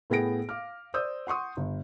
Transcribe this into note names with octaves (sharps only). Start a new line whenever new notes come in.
A2 B3 G#4 G5 A#6 D7
F5 D6 F6
C5 D5 D#6 E6 G6
F#5 C6 C#6 D#6
G1